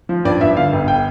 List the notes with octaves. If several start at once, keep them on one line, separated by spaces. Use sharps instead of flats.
F3
G2 D5
G2 E5
D3 F5
G1
G5